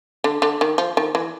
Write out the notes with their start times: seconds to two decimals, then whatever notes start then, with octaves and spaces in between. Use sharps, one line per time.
0.24 D3
0.42 D3
0.61 D#3
0.78 F3
0.97 D#3
1.15 E3